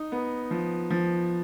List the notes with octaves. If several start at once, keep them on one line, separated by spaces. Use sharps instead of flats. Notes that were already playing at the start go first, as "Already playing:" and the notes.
Already playing: D#4
B3
F3
F3